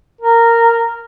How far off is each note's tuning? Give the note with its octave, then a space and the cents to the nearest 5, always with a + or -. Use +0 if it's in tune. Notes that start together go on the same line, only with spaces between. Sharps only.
A#4 -10